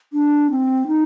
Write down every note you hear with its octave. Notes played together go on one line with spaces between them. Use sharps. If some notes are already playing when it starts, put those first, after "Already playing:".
D4
C4
D#4